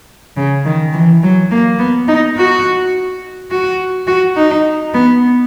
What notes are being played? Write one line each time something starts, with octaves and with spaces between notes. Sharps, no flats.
C#3
D#3
E3
F#3
A#3
B3
D#4
F#4
F#4
F#4
D#4
B3